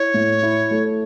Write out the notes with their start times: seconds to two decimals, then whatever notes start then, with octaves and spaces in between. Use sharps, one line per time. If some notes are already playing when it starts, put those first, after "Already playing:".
Already playing: E4 C#5
0.14 A2
0.43 E4
0.71 A3